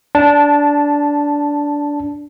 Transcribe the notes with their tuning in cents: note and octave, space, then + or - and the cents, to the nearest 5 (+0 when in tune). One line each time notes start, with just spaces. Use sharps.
D4 -15 A5 +0